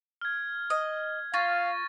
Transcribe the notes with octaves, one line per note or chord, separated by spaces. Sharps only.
F6 G#6
D#5
F4 F5 C#6 A6 A#6